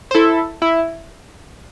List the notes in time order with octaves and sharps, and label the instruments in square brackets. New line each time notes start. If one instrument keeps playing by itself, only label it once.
[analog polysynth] C5
E4 A4
E4